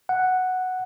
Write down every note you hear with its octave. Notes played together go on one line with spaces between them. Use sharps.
F#5